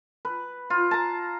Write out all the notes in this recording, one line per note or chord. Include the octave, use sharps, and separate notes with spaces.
B4
F4
A5 A#5